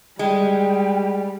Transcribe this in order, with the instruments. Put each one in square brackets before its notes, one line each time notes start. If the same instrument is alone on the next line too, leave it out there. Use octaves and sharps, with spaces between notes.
[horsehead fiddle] G3 [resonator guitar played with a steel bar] G#3 [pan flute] G5